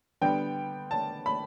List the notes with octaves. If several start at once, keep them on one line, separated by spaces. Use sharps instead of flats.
D3 G3 B3 G5
A5
B5